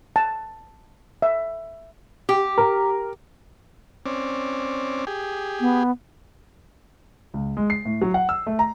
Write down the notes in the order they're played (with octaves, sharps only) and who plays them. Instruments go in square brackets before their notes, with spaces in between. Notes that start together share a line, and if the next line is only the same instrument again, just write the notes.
[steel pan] A5
E5
[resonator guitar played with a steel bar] G4
[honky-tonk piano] A#4
[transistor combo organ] C4 C#4 D5
G4 G#4
[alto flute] B3
[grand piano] C#2
G#3
C7
A2
F#3
F#5
E6
A3
A#5